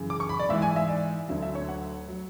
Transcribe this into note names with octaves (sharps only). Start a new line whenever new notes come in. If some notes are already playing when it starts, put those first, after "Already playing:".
Already playing: F#2 C#3 E3
D6
C#6
B5
D5
G#2 E3 E5
G#5
E5
D5
D2 D3 F#3 E5
E5
C#5
F#5
F#3